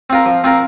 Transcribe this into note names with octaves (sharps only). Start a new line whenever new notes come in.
C4 F4 A#4
F3
C4 F4 A#4